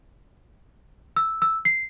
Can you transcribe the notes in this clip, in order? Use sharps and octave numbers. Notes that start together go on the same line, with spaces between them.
E6
E6
C7